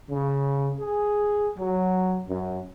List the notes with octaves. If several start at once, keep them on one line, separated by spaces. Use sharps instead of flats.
C#3
G#4
F#3
F#2